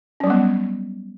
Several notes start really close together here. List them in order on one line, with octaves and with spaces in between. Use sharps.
C#4 F#3 G3 B3